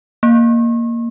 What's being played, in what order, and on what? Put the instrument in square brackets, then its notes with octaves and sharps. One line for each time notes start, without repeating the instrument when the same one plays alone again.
[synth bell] A#3